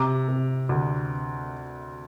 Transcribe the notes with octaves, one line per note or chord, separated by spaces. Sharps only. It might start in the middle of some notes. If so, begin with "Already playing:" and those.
Already playing: C3 A#5 D6
C3
D2